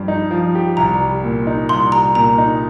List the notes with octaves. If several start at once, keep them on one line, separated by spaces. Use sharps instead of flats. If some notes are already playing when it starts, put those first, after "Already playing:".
Already playing: G2 F3 G4
D#4
F3
G4
C2 A#5
G3
A#2
D#4
C2 C6
G3 A#5
A#2 A#5
D#4